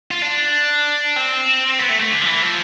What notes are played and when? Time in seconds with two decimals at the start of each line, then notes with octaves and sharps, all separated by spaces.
0.11 F4
0.22 D4
1.16 C4
1.79 B3
1.89 A3
2.00 A3
2.11 D3
2.22 F3
2.26 E3
2.42 F3